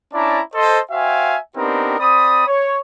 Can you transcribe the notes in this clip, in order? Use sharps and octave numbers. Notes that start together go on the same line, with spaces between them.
C#4 D4 E4 D5 A5 A#5
A4 C5 D#5
F#4 C5 E5 F5 G5 G#5
B3 C4 D4 D#4 G4 A#4
C4 D5 B5 D#6
C#5